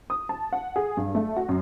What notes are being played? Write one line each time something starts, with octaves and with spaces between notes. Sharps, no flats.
D#6
A5
F#5
G#4
G2
A3
F#4
F#2